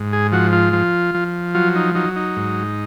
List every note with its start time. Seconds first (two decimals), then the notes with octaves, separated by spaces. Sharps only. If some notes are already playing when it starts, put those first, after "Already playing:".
Already playing: G#2
0.13 G#4
0.32 F3 F#4
0.53 F4
0.73 F3
1.15 F3
1.54 F#3 F4
1.75 D#4
1.95 F#3 D#4
2.16 D#4
2.37 G#2